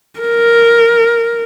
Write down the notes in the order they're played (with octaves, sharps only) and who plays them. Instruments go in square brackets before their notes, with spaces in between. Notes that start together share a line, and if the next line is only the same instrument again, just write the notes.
[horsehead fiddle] A#4